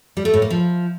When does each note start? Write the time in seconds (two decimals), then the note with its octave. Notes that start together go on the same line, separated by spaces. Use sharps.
0.17 G3
0.25 A3
0.34 A2
0.42 A#3
0.50 F3